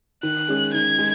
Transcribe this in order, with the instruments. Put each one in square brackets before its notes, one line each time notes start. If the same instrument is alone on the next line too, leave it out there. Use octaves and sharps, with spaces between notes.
[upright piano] D#3 [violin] F#6
[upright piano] G#3 C#4 G#4
[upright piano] D#3 [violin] G#6
[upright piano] G#3